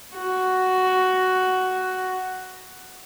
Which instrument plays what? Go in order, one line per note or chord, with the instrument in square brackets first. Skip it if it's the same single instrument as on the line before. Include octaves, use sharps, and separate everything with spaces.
[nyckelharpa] F#4